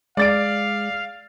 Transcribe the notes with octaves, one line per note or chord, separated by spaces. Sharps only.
G#3 D5 F5 A6 D7